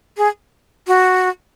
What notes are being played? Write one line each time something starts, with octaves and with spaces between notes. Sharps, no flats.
G#4
F#4